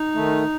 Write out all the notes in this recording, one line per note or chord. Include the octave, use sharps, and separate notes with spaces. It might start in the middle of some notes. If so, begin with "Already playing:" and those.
Already playing: D#4
D#3 A3